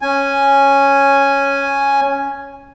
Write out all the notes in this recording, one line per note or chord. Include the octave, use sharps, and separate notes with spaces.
C#4 G#5